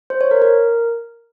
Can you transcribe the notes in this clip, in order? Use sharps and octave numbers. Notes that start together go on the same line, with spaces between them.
C5
C#5
A#4
A#4